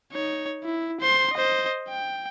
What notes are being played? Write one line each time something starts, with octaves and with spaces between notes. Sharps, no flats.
D#4 C#5
E4
C5 C6
C5 D#5
G5